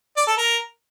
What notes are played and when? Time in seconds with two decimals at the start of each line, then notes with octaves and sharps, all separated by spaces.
0.16 D5
0.27 A4
0.37 A#4